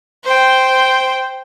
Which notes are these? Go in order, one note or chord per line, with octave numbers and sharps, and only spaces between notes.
C5 G5